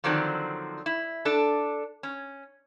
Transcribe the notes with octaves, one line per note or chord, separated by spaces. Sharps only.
D3 D#3 F3 F#3 C4 D4
E4
D4 A4
C#4